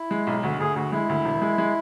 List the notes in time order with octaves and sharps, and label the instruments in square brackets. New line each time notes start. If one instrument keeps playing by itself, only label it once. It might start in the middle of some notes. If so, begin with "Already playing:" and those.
Already playing: [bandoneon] E4
[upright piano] G#3
B1
[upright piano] D2 [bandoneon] F#4
[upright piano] D2 [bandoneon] G#4
[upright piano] D2 [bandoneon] F#4
[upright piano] G#3 [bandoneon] E4
[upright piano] D2
E1
G#3
G#3